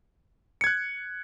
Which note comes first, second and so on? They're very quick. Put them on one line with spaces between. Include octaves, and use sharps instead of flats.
C#7 G#6 F#6